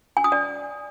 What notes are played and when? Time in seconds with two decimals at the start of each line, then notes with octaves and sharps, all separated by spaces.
0.17 G#5
0.24 D#6
0.32 D5